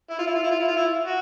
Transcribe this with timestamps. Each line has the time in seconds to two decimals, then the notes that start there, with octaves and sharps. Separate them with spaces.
0.10 E4
0.19 F4
0.26 E4
0.35 F4
0.43 E4
0.51 F4
0.60 E4
0.68 F4
0.76 E4
1.05 F#4